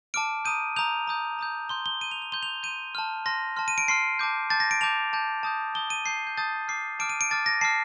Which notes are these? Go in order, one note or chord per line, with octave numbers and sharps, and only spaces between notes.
A5 D6 F6 D7
A#5 D#6 G6 D#7
A#5 D#6 G6 F7
A#5 D#6 G6
A#5 D#6 G6
C6 G6 G7
G7
C6 G6 D#7
F7
F7
C6 G6 G7
F7
C6 G6 D#7
A5 C6 F6
A5 C6 F6 A#6
A5 C6 F6
D#7
D7
A5 C6 F6 C7
A5 D6 G6
A5 D6 G6 A6
A#6
D7
A5 D6 G6 F7
A5 D6 G6
A5 D#6 G6
A5 D#6 G6 G7
D#7
A5 D#6 G6 C7
G6
A5 D#6 G6 A6
A5 D6 F6 C7
A5 D6 F6 D7
D#7
D7
A5 D6 F6 A6
A#6
A5 D6 F6 C7